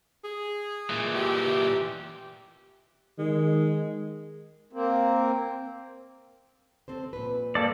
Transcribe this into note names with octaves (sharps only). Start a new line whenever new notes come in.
G#4
A#2 E3
G4
D#3 G#3
A#3 C4
C4 A4 C5
A#2 B4
A#3 A4 D5